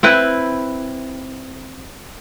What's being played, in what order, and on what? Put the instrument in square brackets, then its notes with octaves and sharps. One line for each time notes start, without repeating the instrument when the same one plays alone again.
[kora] C4 E4 B4